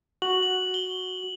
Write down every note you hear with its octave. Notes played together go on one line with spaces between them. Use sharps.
F#4 F#7
F#7
G7